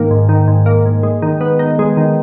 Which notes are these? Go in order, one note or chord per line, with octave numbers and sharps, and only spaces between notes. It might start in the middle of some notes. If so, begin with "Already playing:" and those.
Already playing: G#2 D#3 A#3
G#2
D#3
G#2
A#3
G#2
G#3
D#3
B3
D#4
G#3
D#3